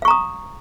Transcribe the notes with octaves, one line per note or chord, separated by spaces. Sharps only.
F5 A#5 C#6 D#6